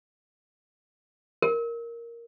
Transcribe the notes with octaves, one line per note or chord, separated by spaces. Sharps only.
A#4